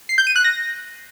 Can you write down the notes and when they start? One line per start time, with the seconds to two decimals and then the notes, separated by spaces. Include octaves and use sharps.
0.09 C7
0.18 G6
0.27 D#7
0.36 F#6
0.44 A#6